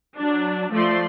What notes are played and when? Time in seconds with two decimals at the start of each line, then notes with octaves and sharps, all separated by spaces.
0.17 F#3 D4
0.72 F3 A3 D5 C6